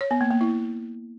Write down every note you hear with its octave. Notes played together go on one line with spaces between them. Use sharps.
C#5
B3
A#3
A#3
E4